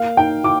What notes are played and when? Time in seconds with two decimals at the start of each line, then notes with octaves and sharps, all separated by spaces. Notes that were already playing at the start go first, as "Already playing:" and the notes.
Already playing: A#3 F5
0.17 D#4 G5
0.44 D#4 D6